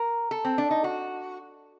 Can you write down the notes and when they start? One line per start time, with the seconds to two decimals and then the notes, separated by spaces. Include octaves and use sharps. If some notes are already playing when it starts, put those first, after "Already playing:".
Already playing: A#4
0.31 A4
0.45 C4
0.58 D4
0.71 D#4
0.84 F#4